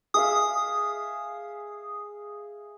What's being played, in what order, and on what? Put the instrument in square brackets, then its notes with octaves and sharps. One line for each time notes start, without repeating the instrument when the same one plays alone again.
[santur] G#4 E5 F5 [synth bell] D#6